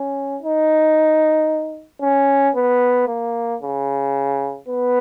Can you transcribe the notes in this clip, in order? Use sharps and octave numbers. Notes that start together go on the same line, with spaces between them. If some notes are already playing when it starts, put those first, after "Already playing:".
Already playing: C#4
D#4
C#4
B3
A#3
C#3
B3